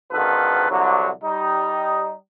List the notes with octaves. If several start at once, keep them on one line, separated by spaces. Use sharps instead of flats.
G#1 D3 D#3 F3 A4 B4
C2 D3 F#3
G3 D#4